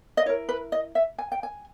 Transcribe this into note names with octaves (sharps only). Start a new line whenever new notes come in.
D#5
E4 A#4 C#5
B4
D#5
E5
G#5
G5
G#5